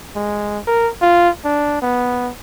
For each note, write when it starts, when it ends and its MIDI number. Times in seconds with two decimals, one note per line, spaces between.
0.16 0.59 56
0.67 0.89 70
1.02 1.30 65
1.45 1.78 62
1.82 2.30 59